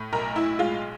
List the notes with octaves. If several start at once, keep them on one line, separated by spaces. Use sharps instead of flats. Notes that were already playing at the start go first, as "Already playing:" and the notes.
Already playing: A2
B1 A#4
E4
G#3 F4